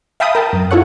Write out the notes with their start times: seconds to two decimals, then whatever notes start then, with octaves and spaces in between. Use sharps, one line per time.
0.20 E5 F5 G5 A5 B5 D#6
0.35 A#4 G5 A5
0.53 F#2
0.71 E4 F4 A4 C#5 F#5